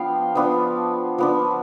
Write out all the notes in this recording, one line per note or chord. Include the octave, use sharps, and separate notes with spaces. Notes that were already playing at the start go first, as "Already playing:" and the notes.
Already playing: F3 B3 D4 F5 G5
F3 B3 D4
F3 B3 D4